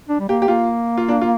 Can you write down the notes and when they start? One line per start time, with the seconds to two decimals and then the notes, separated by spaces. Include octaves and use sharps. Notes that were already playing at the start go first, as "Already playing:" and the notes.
0.09 D4
0.20 G3
0.29 A#3 G4
0.42 G4
0.48 A#3 F4
0.98 F4
1.08 D4
1.21 F4